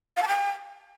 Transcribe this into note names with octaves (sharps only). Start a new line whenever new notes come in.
F5
A5
G5